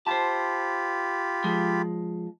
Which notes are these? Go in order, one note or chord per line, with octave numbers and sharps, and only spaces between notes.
F4 G4 C5 A5 B5
F3 G#3